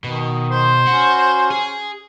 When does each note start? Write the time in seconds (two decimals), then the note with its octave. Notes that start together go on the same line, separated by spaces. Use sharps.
0.04 B2 D#3
0.51 C5
0.87 C#4 F#4
1.51 G#4